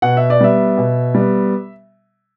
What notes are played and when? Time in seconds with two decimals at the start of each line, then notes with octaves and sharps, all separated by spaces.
0.02 B2 F#5
0.17 E5
0.30 D5
0.41 G3 B3 E5
0.78 B2
1.15 G3 B3